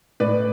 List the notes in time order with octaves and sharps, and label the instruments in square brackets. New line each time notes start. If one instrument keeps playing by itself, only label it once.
[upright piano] A2 B4 D5